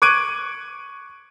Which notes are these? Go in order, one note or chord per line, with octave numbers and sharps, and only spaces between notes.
C#6 D6 F#6 G#6 D7 D#7